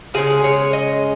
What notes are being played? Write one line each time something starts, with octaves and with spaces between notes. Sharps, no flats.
C#3 G#3 C#4 G#4
C#5
D#5